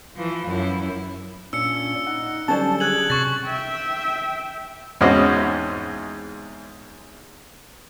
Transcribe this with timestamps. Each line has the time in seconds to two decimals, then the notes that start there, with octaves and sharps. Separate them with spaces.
0.15 E3 F3
0.47 F#2 E4
1.53 A#2 C#4 D4 E6 C#7
2.07 D#4 F#5
2.48 D3 F#3 G3 C#4 C5 D5 A5
2.80 G#4 F#6 G#6 F#7
3.10 C3 C#4 C#6 A6
3.45 E5 G5
5.01 E2 G#2 C4 C#4 F#4 D#5